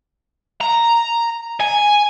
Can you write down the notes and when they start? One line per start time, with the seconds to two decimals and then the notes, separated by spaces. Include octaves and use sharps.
0.61 A#5
1.61 G#5